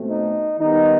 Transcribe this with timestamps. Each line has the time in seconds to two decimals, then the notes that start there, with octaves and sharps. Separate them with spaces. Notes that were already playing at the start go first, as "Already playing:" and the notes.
Already playing: B2 A3 C4
0.08 D#4
0.59 D#3 G3 B3 D#4